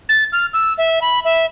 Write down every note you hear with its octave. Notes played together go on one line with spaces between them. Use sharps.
A6
F6
E6
E5
B5
E5